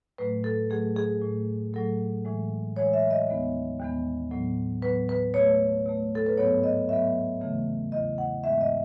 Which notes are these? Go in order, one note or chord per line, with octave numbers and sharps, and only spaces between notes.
A2 F#3 A3 B4
A4
A2 F#3 A3 G#4
G#4
A2 F#3 A3
A2 F#3 A3 A4
A2 E3 G#3
A2 E3 G#3 C#5
E5
D#5
D#2 D#3 G#3 B3
D#2 D#3 G#3 B3
A2 F#3 B3
A2 F#3 B3 B4
B4
B2 A3 C#5
B2 A3
A4
B4
G#2 F#3 B3 C#5
D#5
G#2 F#3 B3 E5
E2 C#3 E3 A3
E2 C#3 E3 A3 D#5
F#5
G#2 E3 G#3 B3 E5
D#5